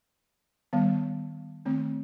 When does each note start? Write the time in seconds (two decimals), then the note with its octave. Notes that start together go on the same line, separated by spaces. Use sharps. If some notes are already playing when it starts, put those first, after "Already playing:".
0.73 D#3 G3 B3
1.66 D#3 A3 C4